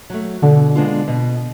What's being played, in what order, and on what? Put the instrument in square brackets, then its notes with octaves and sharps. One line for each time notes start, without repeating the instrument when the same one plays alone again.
[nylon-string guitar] F#3 A3
[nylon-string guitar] B2 [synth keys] D3
[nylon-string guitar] G#3 B3 D4 F4
B2